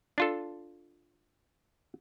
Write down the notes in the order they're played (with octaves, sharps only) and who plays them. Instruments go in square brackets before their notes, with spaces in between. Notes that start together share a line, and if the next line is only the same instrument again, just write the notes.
[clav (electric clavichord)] D4 F4 A4